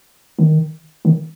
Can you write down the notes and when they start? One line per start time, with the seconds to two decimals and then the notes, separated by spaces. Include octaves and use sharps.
0.39 D#3
1.05 D#3